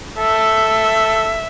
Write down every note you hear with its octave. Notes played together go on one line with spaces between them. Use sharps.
A4 E5